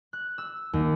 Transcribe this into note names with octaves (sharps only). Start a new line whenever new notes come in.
F#6
E6
D#2